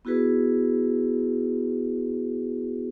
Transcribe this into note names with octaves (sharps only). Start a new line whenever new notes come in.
B3 E4 F#4 G#4 B4